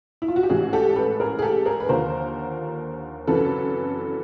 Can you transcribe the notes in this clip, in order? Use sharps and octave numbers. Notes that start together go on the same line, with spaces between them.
E4
F4
F#4
G4
A1 G#2 E3 F#4 G#4
G4 A4
A4 B4
G#4 A#4
G#4
G4 A4
G#4 A#4
B4
D#2 D3 F3 A#4 C5
G#1 F#2 C#3 E3 A4 B4